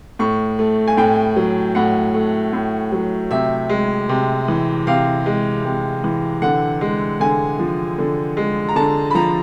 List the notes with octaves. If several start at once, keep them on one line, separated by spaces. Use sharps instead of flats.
A2 C#6
A3
G#5
A2 G5
F#3
A2 F#5
A3
A2
F#3
C3 E5
G#3
C3
E3
C3 F5
G#3
C3
E3
D3 F#5
G#3
D3 G#5
F3
D3
G#3
A#5
D3 A5
B5
F3 A#5